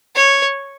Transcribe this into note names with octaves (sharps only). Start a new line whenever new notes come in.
C#5